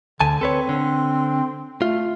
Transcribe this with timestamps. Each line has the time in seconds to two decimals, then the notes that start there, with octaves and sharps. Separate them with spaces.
0.21 D2 D3 G#5 A5
0.41 C4 A4 B4 C#5
0.69 D3
1.82 A3 F4